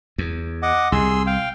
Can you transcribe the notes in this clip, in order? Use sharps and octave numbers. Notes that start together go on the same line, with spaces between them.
E2
D#5 F#5 D6
C2 G#4 C6 E6
F5 G5